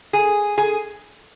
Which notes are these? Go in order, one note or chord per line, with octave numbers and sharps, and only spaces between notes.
G#4
G#4